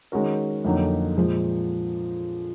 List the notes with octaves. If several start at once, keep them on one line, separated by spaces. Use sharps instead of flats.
D#3 G#3 C#4 F#4 A#4
F2 D3 F#3 A#3 D#4
A#2 F3 G#3